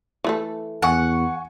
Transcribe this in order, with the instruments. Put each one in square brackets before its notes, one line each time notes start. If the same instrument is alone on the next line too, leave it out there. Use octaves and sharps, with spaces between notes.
[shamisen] E3 A3 A4
[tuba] E2 [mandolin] F#5 [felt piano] G#5 C#6